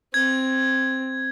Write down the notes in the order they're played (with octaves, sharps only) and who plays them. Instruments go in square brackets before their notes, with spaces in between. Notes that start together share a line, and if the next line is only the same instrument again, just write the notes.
[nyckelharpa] C4 [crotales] G#6